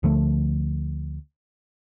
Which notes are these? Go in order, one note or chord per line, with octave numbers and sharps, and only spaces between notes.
D2 D3 F3 A3